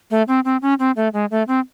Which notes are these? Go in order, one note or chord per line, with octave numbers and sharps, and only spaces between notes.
A3
C4
C4
C#4
C4
A3
G#3
A3
C4